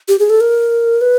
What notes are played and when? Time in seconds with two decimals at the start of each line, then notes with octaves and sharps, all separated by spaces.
0.08 G4
0.19 G#4
0.30 A4
0.40 A#4
1.01 B4